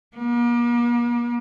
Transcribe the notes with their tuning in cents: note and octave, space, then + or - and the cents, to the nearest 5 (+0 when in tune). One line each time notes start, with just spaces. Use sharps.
A#3 +40